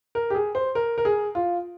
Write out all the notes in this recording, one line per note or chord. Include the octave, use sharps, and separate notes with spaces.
A#4
G4
G#4
C5
A#4
A#4
G#4
F4